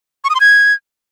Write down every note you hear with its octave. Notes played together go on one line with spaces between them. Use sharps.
C#6
D#6
C6
G#6